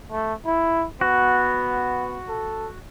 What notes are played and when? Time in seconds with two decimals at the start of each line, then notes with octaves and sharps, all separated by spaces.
0.11 A3
0.45 E4
1.01 B3 F#4
2.29 A4